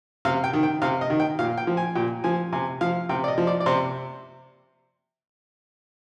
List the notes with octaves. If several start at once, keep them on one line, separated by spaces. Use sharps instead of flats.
C3 F5
G5
D#3
G5
C3 F5
D#5
D#3
G5
A#2 F5
G5
F3
G#5
A#2 G5
F3 G#5
C3 G#5
F3 F5
C3 G5
D5
D#5
F3
D5
D5
C3 C5